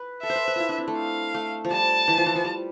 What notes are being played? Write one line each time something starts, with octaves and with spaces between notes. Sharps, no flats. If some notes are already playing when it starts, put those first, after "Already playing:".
Already playing: B4
A4 E5
C5
B4
B4
E4 F4
D4
C4
A3
F5
A3
F3
G3 A5
E3
F3
E3
F3
G3